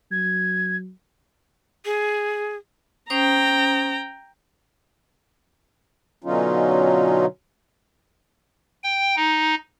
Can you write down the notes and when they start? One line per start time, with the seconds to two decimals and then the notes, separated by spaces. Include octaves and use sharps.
0.11 F#3 G#6
1.86 G#4
3.10 C#4 C5 G5 A#5 D#6
6.24 B2 D3 F#3 C#4 D#4 F4
8.84 G5
9.16 D#4